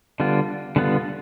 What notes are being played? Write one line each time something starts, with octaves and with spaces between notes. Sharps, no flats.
D3 G3 B3 F4
D3 G3 B3 F4